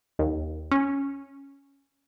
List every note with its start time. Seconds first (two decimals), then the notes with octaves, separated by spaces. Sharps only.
0.19 D#2
0.71 C#4